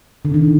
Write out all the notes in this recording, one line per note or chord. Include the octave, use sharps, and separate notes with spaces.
D3
D#3